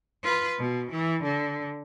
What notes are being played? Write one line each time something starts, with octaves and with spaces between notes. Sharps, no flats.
F4 B4
B2
E3
D3